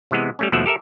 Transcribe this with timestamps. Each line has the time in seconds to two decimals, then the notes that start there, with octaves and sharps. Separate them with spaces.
0.11 C3 E3 G#3 B3
0.39 G3 A3 C#4
0.52 D#2 B2 F3 A3 E5 F#5
0.66 G4 A4 A#4 E5